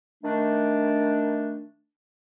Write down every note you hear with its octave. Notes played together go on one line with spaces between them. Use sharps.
D#3 A3 D4